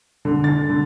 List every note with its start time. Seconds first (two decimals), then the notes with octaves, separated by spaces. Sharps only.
0.25 D3
0.44 A6
0.70 D3